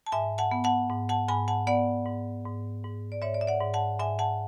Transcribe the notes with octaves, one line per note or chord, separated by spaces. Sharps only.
A5
G#2 E5 G#5
F#5 A5
B3
F#5 A5
G#2
F#5 A5
G#2 G#5 B5
F#5 A5
B3 D5 F#5
G#2
G#2
G#2
D5
G#2 C#5 E5
D5
E5
D5 F#5
G#2
F#5 A5
G#2 E5 G#5
F#5 A5